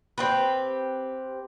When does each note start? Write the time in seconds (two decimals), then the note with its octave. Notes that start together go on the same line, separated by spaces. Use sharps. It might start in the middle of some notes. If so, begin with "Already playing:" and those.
0.18 C4 G4 B4